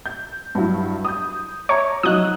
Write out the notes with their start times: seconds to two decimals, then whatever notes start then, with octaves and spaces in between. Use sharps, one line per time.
0.06 G6
0.55 G2 F#3 E4
1.05 D#6 G6
1.69 C#5 E5 A#5
2.03 F3 F#3 D#4 D#6 F#6